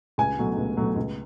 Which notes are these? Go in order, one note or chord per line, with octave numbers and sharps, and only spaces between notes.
C#2 G#5
B2 F#3 A3
C#2
B2 F#3 A3
C#2